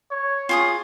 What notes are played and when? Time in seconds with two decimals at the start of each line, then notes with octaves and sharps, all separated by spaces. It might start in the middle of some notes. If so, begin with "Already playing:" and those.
0.11 C#5
0.49 F4 G#4 D#6